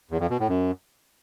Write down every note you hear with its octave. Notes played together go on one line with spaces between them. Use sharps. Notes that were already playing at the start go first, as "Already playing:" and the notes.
E2
F2
B2
A2
F#2